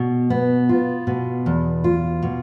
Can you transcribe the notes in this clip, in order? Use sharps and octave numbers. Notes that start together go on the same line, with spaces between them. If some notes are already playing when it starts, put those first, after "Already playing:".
Already playing: B2
B3
F4
B2
E2
F4
B2